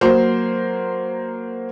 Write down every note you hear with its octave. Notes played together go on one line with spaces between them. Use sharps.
F#3 A#3 C5